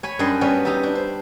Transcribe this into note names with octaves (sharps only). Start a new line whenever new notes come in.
C#5 G#5 B5
F#2 G3 D4 D5 D#5 C6
F#3 G3 B3 C#4
D#4 G4 E5 A5
D4
C5